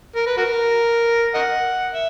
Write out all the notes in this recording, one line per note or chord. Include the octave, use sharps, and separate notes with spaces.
A#4
B4
F#4 A#4
A#4 D#5 F#5
E5